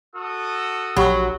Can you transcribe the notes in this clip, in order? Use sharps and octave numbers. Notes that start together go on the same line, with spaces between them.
F#4 A4 D#6
A#1 F#3 G4 B5 C#6